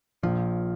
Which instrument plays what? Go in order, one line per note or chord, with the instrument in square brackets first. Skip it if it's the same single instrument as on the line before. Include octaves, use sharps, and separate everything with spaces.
[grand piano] A#1 [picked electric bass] F3